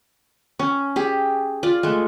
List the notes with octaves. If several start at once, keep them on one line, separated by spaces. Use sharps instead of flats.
C#4
G4 G#4
F4 D5
G#3 A3